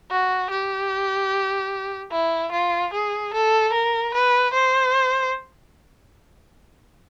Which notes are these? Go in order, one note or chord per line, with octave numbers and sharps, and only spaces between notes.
F#4
G4
E4
F4
G#4
A4
A#4
B4
C5